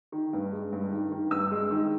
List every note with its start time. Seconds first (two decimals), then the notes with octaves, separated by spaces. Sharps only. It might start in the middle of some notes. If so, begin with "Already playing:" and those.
0.12 D#3
0.33 G2
0.53 G#3
0.73 G2
0.91 D#3
1.12 D#3
1.31 G2 E6
1.51 G#3
1.71 D#3